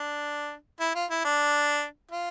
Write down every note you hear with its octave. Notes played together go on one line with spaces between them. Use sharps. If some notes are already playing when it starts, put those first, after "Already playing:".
Already playing: D4
E4
F4
E4
D4
F4